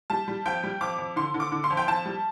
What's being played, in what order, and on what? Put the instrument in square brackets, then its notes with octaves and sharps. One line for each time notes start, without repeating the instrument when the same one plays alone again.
[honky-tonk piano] G3 A5
G3
F2 G5
G3
F2 D6
F2
D3 C6
D3
D6
D3
C6
F2
G5
F2 A5
G3